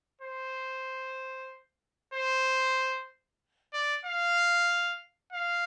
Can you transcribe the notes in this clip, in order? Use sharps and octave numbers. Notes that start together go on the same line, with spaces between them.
C5
C5
D5
F5
F5